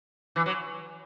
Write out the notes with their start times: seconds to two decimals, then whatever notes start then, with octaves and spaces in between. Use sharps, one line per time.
0.36 E3
0.46 F#3